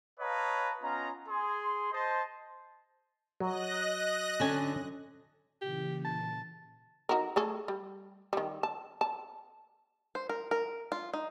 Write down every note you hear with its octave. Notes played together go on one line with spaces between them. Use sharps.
B4 C#5 D#5 F5 A5 A#5
B3 C#4 F4 D#5 A#5
G#4 C6
C5 D#5 A5
F#3 D#5 F#6 A#6
D3 C#4 G#5
A#2 C#3 E3 G4
A5
D#4 F#4 A#4
A3 G#4 A4
G3
D#3 G3
A5
A5
C5
A#4
A#4
F4
D#4